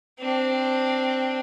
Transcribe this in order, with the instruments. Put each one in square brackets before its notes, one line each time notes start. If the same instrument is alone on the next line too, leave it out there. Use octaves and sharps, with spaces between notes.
[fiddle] C4 D4